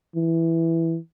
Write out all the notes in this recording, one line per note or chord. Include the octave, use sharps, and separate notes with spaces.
E3